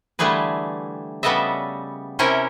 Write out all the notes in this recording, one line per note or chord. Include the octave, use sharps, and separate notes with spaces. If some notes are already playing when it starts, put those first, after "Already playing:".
D3 E3 G3 A3 G#4 B4
C#3 G3 B3 A4 D#5 E5
C3 C#4 E4 A#4 E5 G5